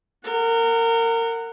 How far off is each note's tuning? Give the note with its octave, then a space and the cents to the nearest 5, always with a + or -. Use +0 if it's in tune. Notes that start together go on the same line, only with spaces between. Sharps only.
A#4 -25 F#5 +0